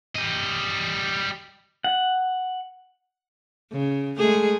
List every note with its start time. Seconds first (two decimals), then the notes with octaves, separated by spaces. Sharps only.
0.16 G3 D#5
1.84 F#5
3.72 C#3
4.18 G#3 A3 G#4